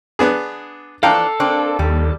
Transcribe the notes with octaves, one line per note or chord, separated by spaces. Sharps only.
B3 D4 G#4
E3 F3 D4 A4 F5 G5 A#5
A#3 C4 D4
D#2 G3